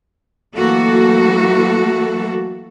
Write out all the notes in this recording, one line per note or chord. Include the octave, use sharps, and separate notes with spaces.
E3 F#3 A3 A#3 F#4 A4